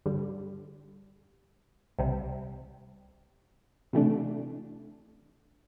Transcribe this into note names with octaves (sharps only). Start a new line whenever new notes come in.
G2 D3 G3
C2 C3 G3
C3 E3 A3 D4